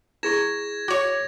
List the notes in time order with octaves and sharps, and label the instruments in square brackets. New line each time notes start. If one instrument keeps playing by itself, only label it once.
[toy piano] E4 G#4 C#6 [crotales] G#6 A#6 E7
[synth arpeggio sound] F#4 C#5 [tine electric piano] D6